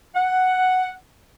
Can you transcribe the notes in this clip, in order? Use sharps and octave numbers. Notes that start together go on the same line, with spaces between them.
F#5